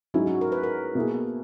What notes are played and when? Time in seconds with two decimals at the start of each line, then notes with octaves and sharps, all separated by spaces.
0.14 G#2 F#3 C#4 D#4 E4
0.27 F#4
0.41 A#4
0.52 B4
0.63 A#4
0.95 B2 A#3 E4 G#4